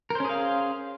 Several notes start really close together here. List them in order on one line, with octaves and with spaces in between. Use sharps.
A#4 C5 C#4 G#4 F5